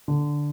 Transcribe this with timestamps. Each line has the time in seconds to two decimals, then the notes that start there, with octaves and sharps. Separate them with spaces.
0.08 D3